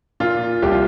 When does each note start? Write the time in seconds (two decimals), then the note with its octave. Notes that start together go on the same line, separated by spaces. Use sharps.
0.20 A#2 F4
0.62 C2 G4
0.71 F4